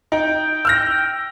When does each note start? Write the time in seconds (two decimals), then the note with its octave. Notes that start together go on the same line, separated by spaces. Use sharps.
0.12 D#4 G5
0.65 E6 F6 A#6